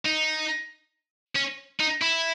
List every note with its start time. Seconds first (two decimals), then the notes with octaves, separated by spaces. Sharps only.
0.05 D#4
1.36 C#4
1.80 D#4
2.02 E4